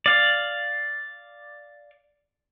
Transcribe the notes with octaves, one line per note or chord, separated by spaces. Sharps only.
D5 F5